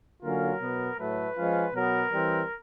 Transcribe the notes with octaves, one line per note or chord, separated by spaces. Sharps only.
D3 F#3 A#3 C#4 F4 A#4
B2 F#3 B3
A2 F#3 A3 B4
F3 G#3 C#4 F4
B2 F#3 B3 A#4
E3 G3 C4